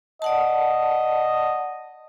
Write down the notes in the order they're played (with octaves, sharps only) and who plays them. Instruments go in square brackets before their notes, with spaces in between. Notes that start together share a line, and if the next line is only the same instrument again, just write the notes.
[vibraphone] D5 F#5 A5 [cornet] D#5